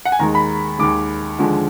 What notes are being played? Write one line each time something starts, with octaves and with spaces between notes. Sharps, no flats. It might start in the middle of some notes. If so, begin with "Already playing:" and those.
F#5
G#5
D#2 D#3 G#3 A#5
B5
D#2 D#3 G#3 D6
D#2 D3 F3 G#3